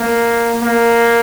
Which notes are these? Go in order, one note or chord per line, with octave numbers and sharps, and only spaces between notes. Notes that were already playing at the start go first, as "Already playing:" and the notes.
Already playing: A#3
A#3